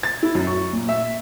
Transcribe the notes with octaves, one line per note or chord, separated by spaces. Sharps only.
A6
E4
F#2
C#6
A#2
E5